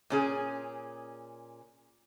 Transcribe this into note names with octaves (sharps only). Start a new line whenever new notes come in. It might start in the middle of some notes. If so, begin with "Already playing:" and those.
A#2 C#4 G#4